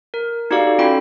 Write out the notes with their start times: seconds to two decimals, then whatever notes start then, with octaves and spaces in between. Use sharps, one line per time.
0.14 A#4
0.51 D#4 F#4 G4 A4 D5 F5
0.67 A4
0.79 C#4 F4 F#4 A4 G5 B5